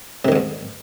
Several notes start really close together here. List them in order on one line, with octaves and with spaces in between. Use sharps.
C3 D#3 G#2 E2